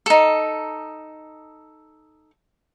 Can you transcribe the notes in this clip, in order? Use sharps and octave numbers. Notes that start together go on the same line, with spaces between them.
D#4 A4